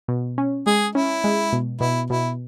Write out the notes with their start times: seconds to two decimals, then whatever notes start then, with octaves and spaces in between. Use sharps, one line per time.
0.08 B2
0.38 C#4
0.66 G#3 G#4
0.95 C#4 E4
1.24 G#3
1.53 B2
1.80 B2 E4
2.10 B2 E4